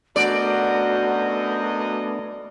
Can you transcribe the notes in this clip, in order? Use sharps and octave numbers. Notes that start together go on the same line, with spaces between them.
F#2 A3 B3 D4 F#4 D5 D#5